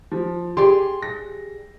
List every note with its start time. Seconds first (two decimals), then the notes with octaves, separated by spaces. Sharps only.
0.12 F3
0.57 G4 G#4 D5 C6
1.03 A#6